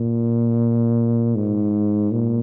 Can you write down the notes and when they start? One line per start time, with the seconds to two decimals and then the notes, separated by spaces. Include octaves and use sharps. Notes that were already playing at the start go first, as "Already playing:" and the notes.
Already playing: A#2
1.35 G#2
2.12 A#2